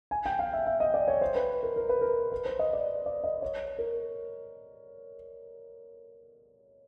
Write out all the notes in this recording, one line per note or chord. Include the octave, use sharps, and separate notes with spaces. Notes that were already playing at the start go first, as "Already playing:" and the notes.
G#5
G5
F5
E5
E5
D#5
D5
C#5
C5
B4
A#4
A#4
B4
A#4
B4
C5
D#5
D5
D5
D#5
C#5
A#4